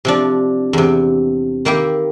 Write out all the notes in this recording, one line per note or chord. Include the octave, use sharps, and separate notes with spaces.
C3 F3 D4
E2 C3
D#3 A#3 E4 G4